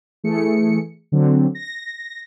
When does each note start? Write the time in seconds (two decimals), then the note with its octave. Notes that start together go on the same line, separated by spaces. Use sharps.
0.24 E3 A3 G#4 C#7
1.12 D3 F#3 C4
1.55 A#6